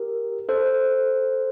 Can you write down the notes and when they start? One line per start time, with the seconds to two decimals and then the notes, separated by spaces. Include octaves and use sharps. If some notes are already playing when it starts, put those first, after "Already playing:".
Already playing: G4 A#4
0.49 A4 C5